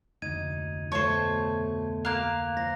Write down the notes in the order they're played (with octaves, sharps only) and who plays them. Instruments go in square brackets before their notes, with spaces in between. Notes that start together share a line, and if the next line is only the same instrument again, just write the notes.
[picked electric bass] F1 D2 [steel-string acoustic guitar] D#4 [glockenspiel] G#6 D#7
[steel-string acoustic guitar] B2 A3 A4 [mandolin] C5 C#5
[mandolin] A#3 F5 [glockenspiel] A#5 F#6 F7
[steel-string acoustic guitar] C5 [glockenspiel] A#6